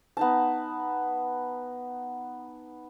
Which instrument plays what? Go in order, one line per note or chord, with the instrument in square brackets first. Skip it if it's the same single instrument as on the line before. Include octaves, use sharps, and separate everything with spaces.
[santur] B3 D#4 A5